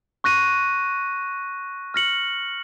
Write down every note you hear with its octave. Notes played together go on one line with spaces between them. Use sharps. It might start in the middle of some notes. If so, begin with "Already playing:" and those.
C#6 F#6 A#6 D#7
F6 A#6 C#7 F#7